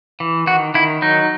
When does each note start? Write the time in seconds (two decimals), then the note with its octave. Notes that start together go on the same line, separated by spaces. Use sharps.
0.20 E3
0.47 D#3 F#4
0.74 D#3 E4
1.02 F#3 D#4